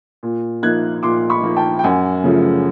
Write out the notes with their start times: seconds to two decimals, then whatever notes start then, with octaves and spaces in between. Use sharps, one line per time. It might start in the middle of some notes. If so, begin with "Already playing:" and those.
0.23 A#2
0.63 F3 A#3 D#4 F#6 G#6
1.03 A#2 C6 D6
1.30 B5 C#6
1.43 F3 A#3 D#4
1.56 G5 A5
1.79 G5
1.84 F#2 F#5 G#5
2.24 C#3 F3 A3